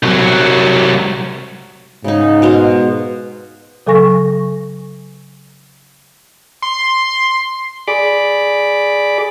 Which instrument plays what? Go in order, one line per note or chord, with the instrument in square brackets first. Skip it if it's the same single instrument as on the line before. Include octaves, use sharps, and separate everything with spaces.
[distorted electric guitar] C2 F#3
[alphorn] G#2 [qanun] C#3 D#4
[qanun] B2 F5 C6
[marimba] C#3 F#3 A4 G#5 C#6 A#6
[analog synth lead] C6
[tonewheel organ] G#4 D5 B5 D6